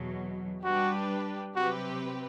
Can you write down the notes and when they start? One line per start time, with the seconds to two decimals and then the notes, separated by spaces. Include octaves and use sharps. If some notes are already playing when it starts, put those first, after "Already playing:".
Already playing: E2 B2 F#3
0.64 G3 D4 F#4 G4 B4
1.56 C3 F#3 C4 F#4 G4 B4